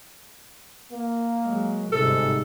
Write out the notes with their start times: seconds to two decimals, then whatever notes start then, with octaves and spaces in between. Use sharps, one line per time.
0.93 A#3
1.44 F#3 G#3
1.92 G1 G#2 C3 A4